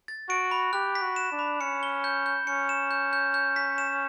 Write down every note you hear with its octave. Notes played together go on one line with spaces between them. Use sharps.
A6
F#4 D7
B5
G4 F#6
B6
F#4
E7
D4
B5
C#4 C#7
G7
G6
G6
C#4 C#7
E7
G6
G6
G6
B6
E7